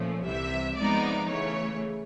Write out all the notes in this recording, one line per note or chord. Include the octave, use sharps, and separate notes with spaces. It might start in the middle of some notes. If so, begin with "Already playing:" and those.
Already playing: A#2 F3 A3 C#4
C2 C3 E3 E5
C3 F3 G#3 B3 D#4 D5
C#3 E3 A3 C#5